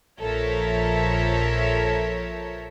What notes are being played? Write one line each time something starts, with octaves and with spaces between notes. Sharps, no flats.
A#1 F3 A4 A#4 C#5 E5